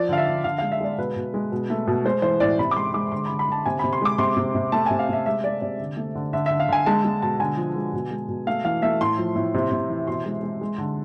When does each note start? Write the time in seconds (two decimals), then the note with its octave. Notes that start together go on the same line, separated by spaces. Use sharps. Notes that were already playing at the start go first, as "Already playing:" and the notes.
Already playing: F3 D5
0.09 D3 F5
0.18 E5
0.27 D3
0.44 D3 F5
0.58 G#3 F5
0.72 E5
0.81 G#3 D5
0.98 B2 B4
1.16 B2
1.34 G#3
1.52 B2
1.70 A3
1.87 B2
2.05 G#3 C5
2.22 E3 C5
2.40 A2 D5
2.59 C3 B5
2.71 D6
2.76 G#3 C6
2.94 G#3 D6
3.12 D3 C6
3.26 D3 B5
3.39 B5
3.48 D3 A5
3.66 C3 G#5
3.79 C3 B5
3.93 C6
4.01 G#3 D6
4.18 C3 C6
4.37 C3
4.55 C3
4.72 A3 A5
4.86 C3 G#5
4.99 F5
5.09 C3 E5
5.26 G#3 E5
5.44 G#3 D5
5.62 C3 D5
5.80 D3
5.97 A3
6.15 D3
6.33 D3 E5
6.46 D3 E5
6.60 F5
6.68 D3 G#5
6.86 G#3 A5
7.05 G#3
7.22 B2 A5
7.39 D3 G#5
7.57 F3
7.76 G#3
7.93 B2
8.11 G#3
8.28 B2
8.47 A3 F5
8.64 E3 F5
8.82 A3 E5
9.01 A2 C6
9.18 F3
9.36 A2
9.54 C3
9.72 C3
9.89 E3
10.07 B2 C6
10.25 G#3
10.43 G#3
10.61 G#3
10.78 D3